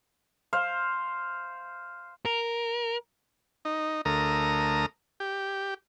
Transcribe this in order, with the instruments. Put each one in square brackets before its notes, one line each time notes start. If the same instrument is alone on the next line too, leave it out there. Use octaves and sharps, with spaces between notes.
[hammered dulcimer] C5 F5
[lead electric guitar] A#4
[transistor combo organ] D#4
D2 A3 A#4 A#5 D#6
G4